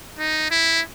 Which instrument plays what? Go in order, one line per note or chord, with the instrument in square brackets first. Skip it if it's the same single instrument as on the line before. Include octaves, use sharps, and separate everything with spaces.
[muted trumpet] D#4
E4